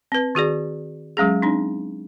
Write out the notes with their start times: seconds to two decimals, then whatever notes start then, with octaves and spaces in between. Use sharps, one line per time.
0.12 C4 B4
0.35 D#3 F#4 G#4 D5
1.17 F#3 G#3 C#4 G#4
1.42 C4 D4 D#4